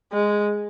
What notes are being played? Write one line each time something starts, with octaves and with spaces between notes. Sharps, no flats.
G#3